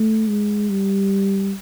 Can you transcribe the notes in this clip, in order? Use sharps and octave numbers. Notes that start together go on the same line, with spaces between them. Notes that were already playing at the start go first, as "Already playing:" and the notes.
Already playing: A3
G#3
G3